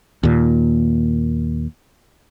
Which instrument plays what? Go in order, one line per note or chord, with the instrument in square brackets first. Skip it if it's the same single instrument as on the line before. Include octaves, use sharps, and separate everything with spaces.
[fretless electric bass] D#2 A#2